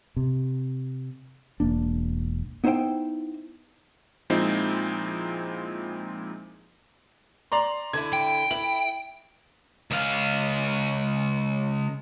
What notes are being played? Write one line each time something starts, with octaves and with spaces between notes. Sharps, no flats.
C3
E1 A#3 D4
B3 D#4 E4 C5 E5 G5
A#2 F3 G#3 C4 D#4 E4
D5 A#5 C6
D3 E4 G#6
G5
E4 F#7
C#2 F5